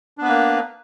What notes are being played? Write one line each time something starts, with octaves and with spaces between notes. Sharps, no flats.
A#3 B3 D4 B4